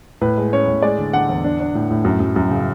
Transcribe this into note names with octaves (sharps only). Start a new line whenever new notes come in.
A2 B4
G#3
C#4 C#5
A2
G#3 D5
D3
D3 F#5
E2
D4
D4
A2
A2
F#2
F#2
F#2
C#3